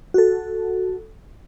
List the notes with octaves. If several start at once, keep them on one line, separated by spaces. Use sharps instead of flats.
F#4 A4